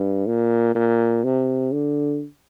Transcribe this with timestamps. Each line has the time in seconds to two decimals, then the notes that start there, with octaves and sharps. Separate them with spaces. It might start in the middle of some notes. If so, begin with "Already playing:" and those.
Already playing: G2
0.27 A#2
0.75 A#2
1.24 C3
1.72 D3